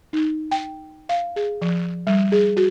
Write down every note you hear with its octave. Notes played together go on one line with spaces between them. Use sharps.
D#4
G5
F5
G#4
F3
G3
G#4
F#4